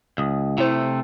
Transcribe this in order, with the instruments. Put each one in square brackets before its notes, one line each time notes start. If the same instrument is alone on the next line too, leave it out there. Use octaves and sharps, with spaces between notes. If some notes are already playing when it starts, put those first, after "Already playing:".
[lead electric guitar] C#2 [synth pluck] D#6
[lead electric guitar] C3 A3 [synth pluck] E4 C5